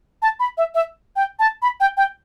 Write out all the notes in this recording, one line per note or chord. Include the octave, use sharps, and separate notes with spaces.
A5
B5
E5
E5
G5
A5
B5
G5
G5